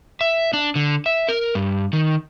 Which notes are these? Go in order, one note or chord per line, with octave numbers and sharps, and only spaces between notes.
E5
D4
D3
E5
A#4
G2
D#3